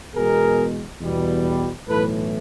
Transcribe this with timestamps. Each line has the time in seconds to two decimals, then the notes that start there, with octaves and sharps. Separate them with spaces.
0.14 E2 B2 G#3 G#4 A#4
1.01 E2 B2 G3
1.88 B1 A2 E3 A4 B4